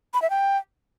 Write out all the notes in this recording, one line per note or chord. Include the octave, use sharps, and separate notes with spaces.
B5
E5
G5